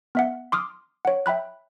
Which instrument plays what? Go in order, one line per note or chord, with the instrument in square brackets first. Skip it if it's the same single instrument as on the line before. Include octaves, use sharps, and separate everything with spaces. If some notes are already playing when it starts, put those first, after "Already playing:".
[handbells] B3 E5 F#5
C6 D6 D#6 F6
C#5 F#5
E5 G5 B5 F#6